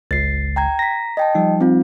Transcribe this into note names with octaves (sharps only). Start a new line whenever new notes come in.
G1 C#2 A6 C7
G5 A#5 G#6
A#5 A#6 B6
D#5 G5 A5
F3 G3 D#4
C4 F4